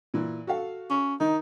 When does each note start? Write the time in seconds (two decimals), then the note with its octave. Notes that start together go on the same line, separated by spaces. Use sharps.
0.14 A#2 E3
0.47 F#4 A4 F5
0.90 C#4
1.20 D#3 D#4